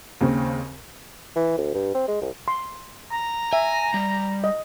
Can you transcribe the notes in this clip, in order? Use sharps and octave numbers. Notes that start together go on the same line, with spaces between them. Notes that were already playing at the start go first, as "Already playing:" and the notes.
D#2 C#3 C4
E3
D2
G2
C4
G#3
C2
C6
A#5
E5 G#5
G3
D#5